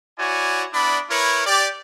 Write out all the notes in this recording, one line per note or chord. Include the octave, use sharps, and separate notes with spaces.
E4 F#4 C#5 D5 G#5
B3 D4 E4 D5 B5
E4 A#4 B4 C#5
G4 D5